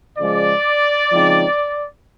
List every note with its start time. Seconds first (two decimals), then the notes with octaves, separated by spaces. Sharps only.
0.19 C#3 F3 G#3 D5
1.12 C#3 F3 G#3 C4 D#4